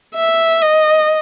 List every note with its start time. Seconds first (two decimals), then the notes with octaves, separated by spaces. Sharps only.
0.15 E5
0.62 D#5